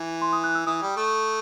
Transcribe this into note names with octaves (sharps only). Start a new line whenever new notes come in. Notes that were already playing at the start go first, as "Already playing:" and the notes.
Already playing: E3
C6
D#6
F#6
E6
E3 D#6
G3
A3